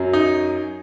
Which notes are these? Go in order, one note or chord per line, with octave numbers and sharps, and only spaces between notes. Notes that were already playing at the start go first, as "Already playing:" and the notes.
Already playing: F#2 F#3
D#4